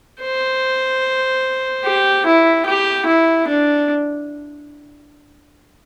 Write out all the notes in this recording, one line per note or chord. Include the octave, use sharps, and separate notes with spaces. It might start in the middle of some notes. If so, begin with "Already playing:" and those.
C5
G4
E4
G4
E4
D4